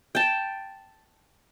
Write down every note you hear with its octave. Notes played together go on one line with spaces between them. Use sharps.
G5 A5